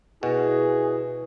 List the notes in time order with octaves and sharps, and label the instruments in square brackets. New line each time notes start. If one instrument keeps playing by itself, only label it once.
[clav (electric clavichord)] B2 [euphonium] E4 [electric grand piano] F#4 [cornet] G#4